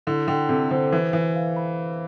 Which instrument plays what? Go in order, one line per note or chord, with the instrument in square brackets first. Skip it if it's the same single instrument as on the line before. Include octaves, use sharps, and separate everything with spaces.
[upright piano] D3 [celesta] E4
[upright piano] D3 [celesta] G5
[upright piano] C3 [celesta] A4
[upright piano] D3 [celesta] C5
[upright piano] E3 [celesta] B4
[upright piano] E3 [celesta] B4
[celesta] F5
B5